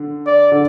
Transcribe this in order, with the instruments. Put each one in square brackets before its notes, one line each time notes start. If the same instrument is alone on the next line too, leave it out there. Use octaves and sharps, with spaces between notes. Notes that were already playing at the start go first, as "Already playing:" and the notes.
Already playing: [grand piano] D3
[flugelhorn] D5
[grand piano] D3